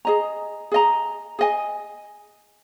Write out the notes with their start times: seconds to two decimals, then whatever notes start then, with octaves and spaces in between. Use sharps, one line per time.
0.05 G#4 D#5 A#5
0.72 G#4 D#5 A#5
1.39 G#4 D#5 G#5